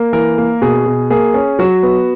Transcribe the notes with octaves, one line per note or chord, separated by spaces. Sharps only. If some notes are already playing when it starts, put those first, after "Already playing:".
Already playing: A#3
E3 A#4
A#3
B2 G#4
B2
A#3 G#4
C#4
F#3 F#4
B3